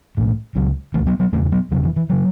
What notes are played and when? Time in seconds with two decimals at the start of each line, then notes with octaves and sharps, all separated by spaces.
0.17 B1 A2
0.55 C#2 C#3 F#3
0.94 C#2 C#3 E3 A3
1.07 F#3 B3
1.20 F#3 B3
1.32 E1 E2 C#3 A3 C#4
1.52 F#3 B3
1.71 E1 E2 C#3 F#3
1.84 E3
1.96 E3
2.10 C#3 F#3